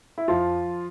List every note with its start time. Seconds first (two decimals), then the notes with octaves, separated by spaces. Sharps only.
0.18 E4
0.28 F2 F3 F4